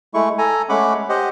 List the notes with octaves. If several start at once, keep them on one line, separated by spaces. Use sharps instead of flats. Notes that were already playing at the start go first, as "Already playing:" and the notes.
G#3 A3 E4 C#6
A4 G#5 A#5
G#3 A3 C#4 F#5 B5 D6
G4 C5 D#5 F#5